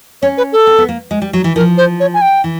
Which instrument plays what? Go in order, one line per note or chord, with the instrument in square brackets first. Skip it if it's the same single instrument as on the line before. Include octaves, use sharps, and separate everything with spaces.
[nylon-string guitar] C#4 [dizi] C#5
[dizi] B4
A4
[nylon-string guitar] C4
B3
A#3
G#3
G3
F#3
E3
[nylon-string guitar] F3 [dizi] A#4
[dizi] C5
C#5
G#5
G5
[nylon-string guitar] E3